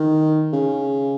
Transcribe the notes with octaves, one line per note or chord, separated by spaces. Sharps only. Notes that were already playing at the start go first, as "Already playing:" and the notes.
Already playing: D#3
C#3